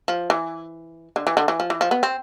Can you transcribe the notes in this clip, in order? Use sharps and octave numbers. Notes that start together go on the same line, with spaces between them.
F3
E3
D3
E3
D3
E3
F3
E3
F3
B3
C4